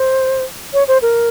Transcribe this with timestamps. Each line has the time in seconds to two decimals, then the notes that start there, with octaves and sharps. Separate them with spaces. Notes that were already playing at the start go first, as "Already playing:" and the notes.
Already playing: C5
0.73 C#5
0.88 C5
1.02 A#4